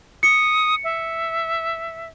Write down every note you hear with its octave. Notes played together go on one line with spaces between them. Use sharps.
D#6 C#7
E5